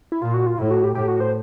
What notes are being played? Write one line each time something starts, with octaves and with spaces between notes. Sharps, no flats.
E4
A#2 F4
F#4
F4
A2 E4
F#4
G4
A2 G4
F#4
C5